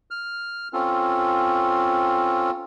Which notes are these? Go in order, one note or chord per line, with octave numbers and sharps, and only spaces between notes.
F6
C4 C#4 F4 A4